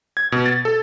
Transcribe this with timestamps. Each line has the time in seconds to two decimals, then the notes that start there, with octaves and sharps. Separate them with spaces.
0.17 G#6
0.32 B2
0.46 A6
0.65 A4